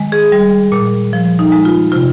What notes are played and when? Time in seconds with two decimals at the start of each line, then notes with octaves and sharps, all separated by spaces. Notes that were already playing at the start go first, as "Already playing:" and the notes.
Already playing: D#3 G#3
0.12 G#4
0.32 G3
0.72 A#2
1.13 F3
1.39 D#4
1.52 G#3
1.65 F4
1.92 C3 F4